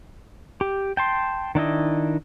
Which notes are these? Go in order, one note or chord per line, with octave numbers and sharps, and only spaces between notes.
G4
G5 A5 C6
D#3 D4 E4 D#5